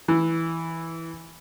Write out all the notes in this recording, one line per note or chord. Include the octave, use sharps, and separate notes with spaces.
E3